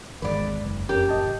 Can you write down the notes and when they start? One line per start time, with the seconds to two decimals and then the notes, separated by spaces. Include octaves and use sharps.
0.22 G#1 E2 G#3 B4 D5
0.64 F#1
0.89 F2 C#4 G4 A#4
1.09 A1 D#5 A5